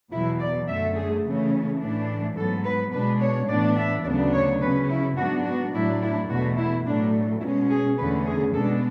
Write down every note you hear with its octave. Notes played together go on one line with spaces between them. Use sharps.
E2 B2 F#3 E4
D5
F#2 D3 A3 E5
G#4
C#3 E3 A3 C#4
A2 E3 A3 D4
G#2 F#3 B3 A4
B4
B2 G#3 D4 B4
C#5
A2 E3 B3 D4 D5
E5
D2 C#3 F#3 B3 D4 D5
C#5
C#3 F#3 C#4 B4
E4
G#2 F#3 B3 D4 F#4
F#4
A2 F#3 A3 D4 E4
E4
E2 B2 A3 F#4
E4
A2 F#3 A3 D4
B2 G#3 C#4 E4
G#4
E2 D3 A3 C#4 B4
G#4
B2 G#3 B3 D4 A4